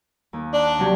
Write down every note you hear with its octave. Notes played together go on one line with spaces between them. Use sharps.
D#2
D4
C3 F#3 G4